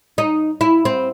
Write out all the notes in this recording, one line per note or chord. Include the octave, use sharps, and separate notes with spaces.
D#4
E4
C4